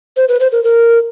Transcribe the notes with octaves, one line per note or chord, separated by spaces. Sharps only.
C5
B4
C5
A#4
A#4